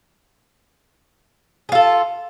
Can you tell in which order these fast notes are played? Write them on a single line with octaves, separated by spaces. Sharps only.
G#4 F4 A4